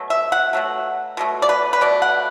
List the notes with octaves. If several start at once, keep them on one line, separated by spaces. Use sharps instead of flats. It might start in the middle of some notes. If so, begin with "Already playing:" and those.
Already playing: B2 F#3 A3
E5
F#5
B2 F#3 A3
B2 F#3 A3
D5
B4
B4
B2 A3 D5
F#5